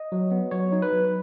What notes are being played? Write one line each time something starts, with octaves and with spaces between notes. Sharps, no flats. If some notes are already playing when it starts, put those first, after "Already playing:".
Already playing: D#5
F#3
B3
F#3 C#5
D#4
B4
F#3